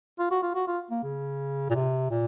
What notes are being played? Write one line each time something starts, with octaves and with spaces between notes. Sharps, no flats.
F4
F#4
F4
F#4
F4
A#3
C#3
A#2
C3
A#2